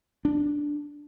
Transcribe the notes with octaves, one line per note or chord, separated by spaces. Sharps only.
D4